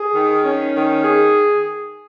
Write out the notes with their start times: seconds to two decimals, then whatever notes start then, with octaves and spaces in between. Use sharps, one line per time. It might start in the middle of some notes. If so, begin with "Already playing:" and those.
Already playing: G#4
0.14 D#3
0.44 C#4
0.74 D#3
1.04 G#4